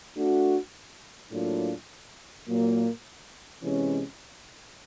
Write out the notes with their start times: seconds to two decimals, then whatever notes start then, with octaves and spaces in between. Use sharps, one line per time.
0.15 A3 D4 F#4
1.30 A2 F#3 A#3 D4 F4
2.46 A#2 F#3 A#3
3.62 C3 E3 G#3 C#4